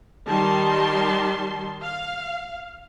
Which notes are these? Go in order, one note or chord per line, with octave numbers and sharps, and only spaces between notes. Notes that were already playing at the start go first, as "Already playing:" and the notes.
D#3 G3 A5 C6
F5